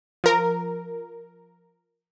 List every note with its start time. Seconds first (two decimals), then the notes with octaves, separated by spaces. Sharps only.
0.24 F3 A#4